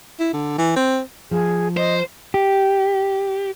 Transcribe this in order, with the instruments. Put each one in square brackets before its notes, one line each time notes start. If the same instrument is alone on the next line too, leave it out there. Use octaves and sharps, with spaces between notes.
[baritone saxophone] E4
D3
E3
C4
[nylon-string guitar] F3 [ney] G#4
[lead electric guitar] C5 [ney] D#5
[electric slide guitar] G4